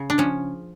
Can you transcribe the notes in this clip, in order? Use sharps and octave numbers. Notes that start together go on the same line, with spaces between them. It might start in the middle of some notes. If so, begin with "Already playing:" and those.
Already playing: C#3
D4
F3 C#4